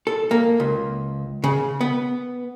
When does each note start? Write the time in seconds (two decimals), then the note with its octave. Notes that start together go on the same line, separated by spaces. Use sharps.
0.07 A4
0.31 A#3
0.60 C#2
1.44 C#3
1.81 B3